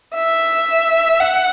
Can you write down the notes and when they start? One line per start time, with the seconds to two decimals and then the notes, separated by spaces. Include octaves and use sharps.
0.16 E5
1.20 F#5